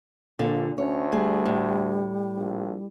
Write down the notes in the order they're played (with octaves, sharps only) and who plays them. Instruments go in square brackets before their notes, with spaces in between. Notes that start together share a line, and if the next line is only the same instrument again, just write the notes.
[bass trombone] A#1 [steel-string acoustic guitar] A#2 D3
[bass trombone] D2 [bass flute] C#4 [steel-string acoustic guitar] C#5
[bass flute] G3 [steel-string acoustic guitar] A3 G#4
[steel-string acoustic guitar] A2
[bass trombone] A#1